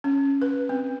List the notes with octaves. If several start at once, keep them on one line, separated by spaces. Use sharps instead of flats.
C#4
B4
C4